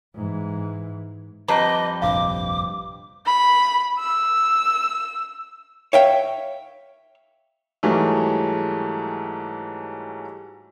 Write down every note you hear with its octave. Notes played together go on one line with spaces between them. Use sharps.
G#2 E3
F2 G3 B4 D#5 A5 A#5 D6
F1 A#1 G2 F5 D6
B5
E6
C#5 E5 F5 G5
G#2 E3 F#3 G3 A3